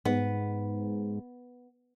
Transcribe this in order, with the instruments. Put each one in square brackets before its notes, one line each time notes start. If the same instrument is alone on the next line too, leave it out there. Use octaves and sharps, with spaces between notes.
[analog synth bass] G#2 [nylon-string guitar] B3